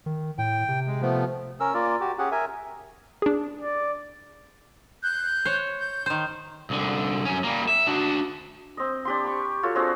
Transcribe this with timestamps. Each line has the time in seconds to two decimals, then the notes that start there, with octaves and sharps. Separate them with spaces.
0.06 D#3
0.38 A2 G5
0.68 C3
0.87 G#3
1.02 F3 A3 B3
1.60 C#4 A#4 E6
1.74 A#3 F4 A#4 D5
2.01 F#4 G4
2.18 C#4 G4 G#4 F#5
2.32 A#4 E5 G#5
3.22 D4 G#4
3.61 D5
5.03 F#6 G6
5.45 C5 C#5
5.79 G6
6.06 D#3 C5
6.70 C2 D3
7.25 F#2 C#4
7.44 G3 A#3
7.68 E5
7.87 D4 F#4
8.77 C4 D#5
9.05 D4 G4 C6
9.24 B5 C#6
9.63 F4 F#4 A4 C#5
9.75 C4 D4 F#4 G#4